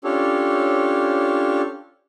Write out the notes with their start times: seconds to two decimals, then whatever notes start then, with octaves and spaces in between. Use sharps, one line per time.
0.04 C#4 D4 F4 G4 A4 C#5